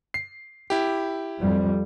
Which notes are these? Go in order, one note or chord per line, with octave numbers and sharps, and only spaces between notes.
C7
E4 G4
F2 G3